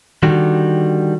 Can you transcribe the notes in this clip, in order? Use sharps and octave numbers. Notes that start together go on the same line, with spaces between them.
D3 D#3 G3 F#4